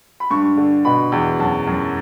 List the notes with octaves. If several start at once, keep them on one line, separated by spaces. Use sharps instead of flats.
B5
G2 C#6
D3
B2 B5
E2
F#2 A5
F#2